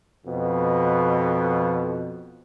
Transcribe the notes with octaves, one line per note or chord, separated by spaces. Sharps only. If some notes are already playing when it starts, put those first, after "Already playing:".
F2 B2